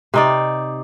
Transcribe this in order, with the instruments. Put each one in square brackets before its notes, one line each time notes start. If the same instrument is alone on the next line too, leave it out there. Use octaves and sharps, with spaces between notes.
[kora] C3 D#4 D5